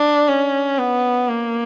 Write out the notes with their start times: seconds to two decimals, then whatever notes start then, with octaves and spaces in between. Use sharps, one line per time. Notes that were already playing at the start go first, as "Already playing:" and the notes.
Already playing: D4
0.28 C#4
0.79 B3
1.29 A#3